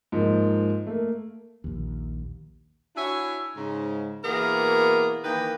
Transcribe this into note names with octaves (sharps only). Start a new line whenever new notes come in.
G#2 F3 A#3
A3 A#3
A#1 D#2
D4 E4 F#4 C#5 E5 G#5
G#2 C#3
B2 E3 A#3 B3 G#4 A#4
D#3 E3 A#3 B4 D#5 G5